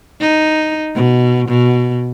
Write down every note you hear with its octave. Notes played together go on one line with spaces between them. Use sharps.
D#4
B2
B2